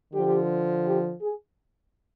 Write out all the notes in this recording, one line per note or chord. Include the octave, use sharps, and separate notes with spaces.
D3 F3 G4
G4
G#4